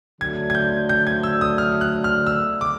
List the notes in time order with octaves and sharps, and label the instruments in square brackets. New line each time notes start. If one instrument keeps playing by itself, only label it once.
[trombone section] D3 F#3 A3 D4 [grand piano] G#6
[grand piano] G#6
G6
G6
G#6
E6
D#6
F6
F#6
F6
E6
D6